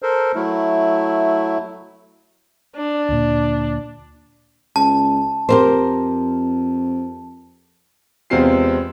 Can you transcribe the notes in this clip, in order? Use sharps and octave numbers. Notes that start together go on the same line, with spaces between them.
A4 A#4 C5
F#3 A3 E4
D4
D2 A#2
C#2 A5
F2 G4 A#4 C5
E2 C3 G#3 C4 F4 C7